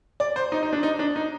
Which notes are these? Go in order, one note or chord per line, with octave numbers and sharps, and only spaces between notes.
D5
C5
D#4
D#4
D4
D#4
D4
D#4